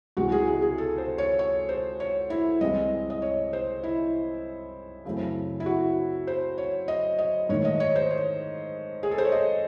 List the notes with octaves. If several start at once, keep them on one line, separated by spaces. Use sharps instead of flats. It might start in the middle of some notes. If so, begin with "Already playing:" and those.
C#2 C3 E3 G#3 F#4
G#4
G#4
G#4
A4
C5
C#5
C#5
C5
C#5
E4
C2 C3 E3 G#3 C4 D#5
D#5
C#5
C5
E4
F#2 C#3 E3 A3 C4
E4
F#4
C5
C#5
D#5
D#5
G#2 D#3 A3 C#5
D#5
C#5
C5
C#5
G#4
A4
C5
C#5
D#5